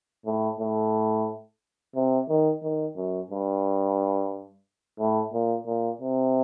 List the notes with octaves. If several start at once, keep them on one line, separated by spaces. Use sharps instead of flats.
A2
A2
C3
D#3
D#3
F#2
G2
A2
A#2
A#2
C3